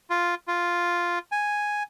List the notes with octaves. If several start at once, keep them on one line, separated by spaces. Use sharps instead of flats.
F4
F4
G#5